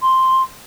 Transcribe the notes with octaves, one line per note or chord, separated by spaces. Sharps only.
C6